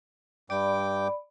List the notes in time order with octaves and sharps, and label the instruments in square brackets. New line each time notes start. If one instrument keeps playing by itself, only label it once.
[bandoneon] G2 G5 D6 [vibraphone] D5 B5